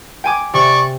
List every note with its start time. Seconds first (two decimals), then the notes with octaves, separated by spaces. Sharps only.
0.24 G5 G#5 D6
0.54 C3 D5 C#6